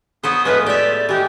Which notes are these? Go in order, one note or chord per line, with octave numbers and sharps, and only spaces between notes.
F#3 B3 C5 D#6
A2 F3 G#3 B4
G4 D5 E5
E3 G#3 G4